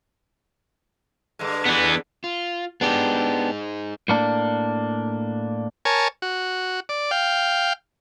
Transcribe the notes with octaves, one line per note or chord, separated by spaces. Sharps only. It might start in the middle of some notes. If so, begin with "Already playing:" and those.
G2 D3 G#3
E3 B3
F4
B3 D4 D#4 G4 G#4
A2 A#3 D4
A#4 C#5 G#5 A5
F#4
D5
F5 G5